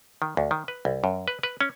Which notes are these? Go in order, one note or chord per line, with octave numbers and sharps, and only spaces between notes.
D#3
D2
D#3
B4
C2
F#2
B4
B4
C#4